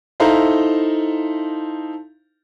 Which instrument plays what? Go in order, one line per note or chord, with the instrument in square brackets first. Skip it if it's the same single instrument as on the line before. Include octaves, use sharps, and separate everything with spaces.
[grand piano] D#4 E4 A4 C5 F5 A#5